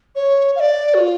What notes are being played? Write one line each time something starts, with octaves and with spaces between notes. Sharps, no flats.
C#5
F5
D5
F#4
F4